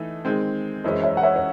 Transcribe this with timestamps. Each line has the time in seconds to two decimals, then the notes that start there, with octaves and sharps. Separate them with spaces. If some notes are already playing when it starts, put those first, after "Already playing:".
Already playing: E3 A3 D#4
0.25 D#3 G#3 C4
0.84 F#2 E3 G#3 C#4 C5 D#5
1.04 C#5 E5
1.17 F#5
1.23 C#5 E5
1.36 C#5